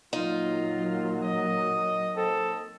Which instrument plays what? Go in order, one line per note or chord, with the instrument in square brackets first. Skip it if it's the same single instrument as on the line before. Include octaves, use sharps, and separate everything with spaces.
[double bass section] A#2 F#3 A#3 [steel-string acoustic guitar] D#4 [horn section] F4
[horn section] D#5
[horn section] C4 D#5 [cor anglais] A4